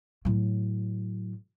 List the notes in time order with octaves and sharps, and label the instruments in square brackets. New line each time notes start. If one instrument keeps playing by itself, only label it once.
[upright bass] A2 F#3